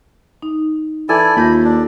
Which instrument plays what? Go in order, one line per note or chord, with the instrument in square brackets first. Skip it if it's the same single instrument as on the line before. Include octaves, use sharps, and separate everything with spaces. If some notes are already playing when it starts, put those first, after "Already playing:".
[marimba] D#4
[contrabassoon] E3 [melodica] E4 D5 G#5 [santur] A4
[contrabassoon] D#2 [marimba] F4 G6 A#6 [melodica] B5
[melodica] D4